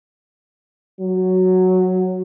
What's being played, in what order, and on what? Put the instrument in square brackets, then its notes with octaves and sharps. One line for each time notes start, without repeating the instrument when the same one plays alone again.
[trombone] F#3